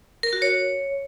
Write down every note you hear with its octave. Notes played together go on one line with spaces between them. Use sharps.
A#4
F#4
C#5